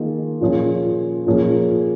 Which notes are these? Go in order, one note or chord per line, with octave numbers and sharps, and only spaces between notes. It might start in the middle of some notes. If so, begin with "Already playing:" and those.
Already playing: D#3 A#3 F4 G#4
A#2 F3 C#4 F4 G#4
A#2 F3 A#3 C#4 G#4